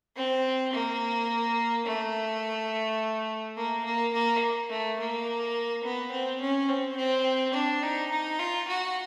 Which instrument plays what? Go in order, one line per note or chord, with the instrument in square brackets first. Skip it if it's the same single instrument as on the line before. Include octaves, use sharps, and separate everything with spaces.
[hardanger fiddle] C4
A#3
A3
A#3
A#3
A#3
A3
A#3
B3
C4
C#4
C4
C4
D4
D#4
D#4
F4
F#4